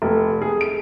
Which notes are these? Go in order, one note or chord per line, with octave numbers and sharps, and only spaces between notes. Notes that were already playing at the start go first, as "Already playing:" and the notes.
F1
G#4
D7